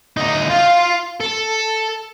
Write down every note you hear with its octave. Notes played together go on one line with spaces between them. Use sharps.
D2 D#4
F4 F5
A4